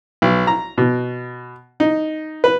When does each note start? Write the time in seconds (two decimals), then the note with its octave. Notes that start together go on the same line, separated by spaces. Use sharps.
0.22 B1
0.47 A#5
0.78 B2
1.80 D#4
2.44 B4